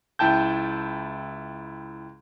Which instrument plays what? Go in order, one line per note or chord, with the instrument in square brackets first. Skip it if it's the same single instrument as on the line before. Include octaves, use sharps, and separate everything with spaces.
[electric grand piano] C#2 E4 G5 A5 G6